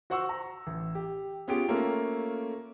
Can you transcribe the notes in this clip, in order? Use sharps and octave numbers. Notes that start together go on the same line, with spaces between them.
F#4 C5 F#5 C#6 E6
A#5
A1
G4
B3 C#4 F4 G4 G#4 D7
A3 A#3 C#4 F4 A4 A#4